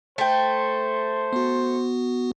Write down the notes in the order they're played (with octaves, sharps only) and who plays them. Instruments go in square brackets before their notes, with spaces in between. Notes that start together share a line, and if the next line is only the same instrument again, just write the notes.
[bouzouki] A3 G5 [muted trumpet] C5
[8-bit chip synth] B3 F#4